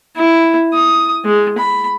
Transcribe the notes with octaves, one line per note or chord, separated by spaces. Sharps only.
E4
D#6
G#3
B5